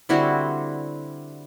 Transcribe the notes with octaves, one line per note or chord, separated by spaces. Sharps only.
D3 G3 C4 E4 F#4